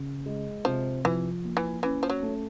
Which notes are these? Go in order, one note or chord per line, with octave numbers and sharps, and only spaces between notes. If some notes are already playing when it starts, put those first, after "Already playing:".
Already playing: C#3
G#3
C3 F3
E3 F3
A#3
E3
E3 C#4
F3
F#3
A3